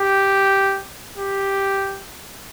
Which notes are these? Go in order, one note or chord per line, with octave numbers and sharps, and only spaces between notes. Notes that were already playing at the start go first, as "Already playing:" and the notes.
Already playing: G4
G4